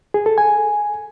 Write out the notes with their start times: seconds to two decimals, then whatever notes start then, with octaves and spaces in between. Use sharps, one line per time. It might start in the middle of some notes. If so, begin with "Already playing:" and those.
0.14 G#4
0.26 A4
0.38 G#5